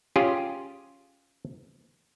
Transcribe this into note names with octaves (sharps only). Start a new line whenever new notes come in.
C#4 F4 G4 G#4